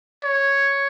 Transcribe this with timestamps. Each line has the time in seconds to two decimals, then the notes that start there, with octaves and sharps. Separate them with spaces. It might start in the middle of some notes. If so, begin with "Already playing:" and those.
0.24 C#5